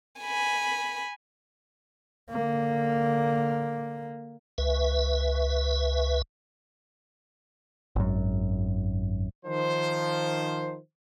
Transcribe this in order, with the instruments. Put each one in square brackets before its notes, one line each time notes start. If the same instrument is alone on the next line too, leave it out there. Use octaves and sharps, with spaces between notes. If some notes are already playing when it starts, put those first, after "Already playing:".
[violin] G#5 B5
[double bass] D3 A#3
[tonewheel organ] C#2 B4 E5
[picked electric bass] G#1 F#2
[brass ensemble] D#3 F3 C5